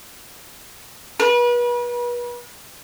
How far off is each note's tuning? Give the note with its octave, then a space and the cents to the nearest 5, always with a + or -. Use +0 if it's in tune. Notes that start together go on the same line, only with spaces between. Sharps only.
B4 -35